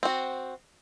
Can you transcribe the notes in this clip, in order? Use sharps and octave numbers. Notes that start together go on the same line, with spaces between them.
C4 F#4